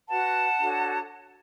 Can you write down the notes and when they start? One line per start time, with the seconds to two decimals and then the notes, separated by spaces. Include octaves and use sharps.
0.08 F#4 B4 F#5 A5
0.59 D4 F#4 A4 C#5